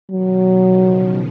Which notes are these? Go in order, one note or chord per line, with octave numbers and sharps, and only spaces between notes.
B2 D#3 F#3
C#3 F3